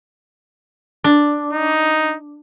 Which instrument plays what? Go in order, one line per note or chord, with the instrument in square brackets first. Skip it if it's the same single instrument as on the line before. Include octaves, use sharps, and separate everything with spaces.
[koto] D4
[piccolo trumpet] D#4